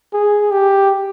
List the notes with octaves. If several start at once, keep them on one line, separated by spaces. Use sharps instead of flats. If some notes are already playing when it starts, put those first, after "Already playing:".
G#4
G4